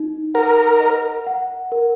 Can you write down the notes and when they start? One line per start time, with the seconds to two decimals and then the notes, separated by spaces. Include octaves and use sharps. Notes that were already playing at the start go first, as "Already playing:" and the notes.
Already playing: D#4
0.34 A#4 F#5
0.80 D#5
1.27 F#5
1.72 A#4